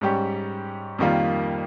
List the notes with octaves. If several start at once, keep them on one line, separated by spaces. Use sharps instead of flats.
G#2 G3 C#4 G4
F2 D#3 G3 A#3 F4